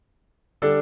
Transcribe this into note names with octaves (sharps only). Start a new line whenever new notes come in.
D3 G3 D4 A4